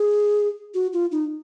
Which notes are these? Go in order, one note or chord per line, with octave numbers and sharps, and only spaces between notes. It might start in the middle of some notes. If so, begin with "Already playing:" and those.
Already playing: G#4
F#4
F4
D#4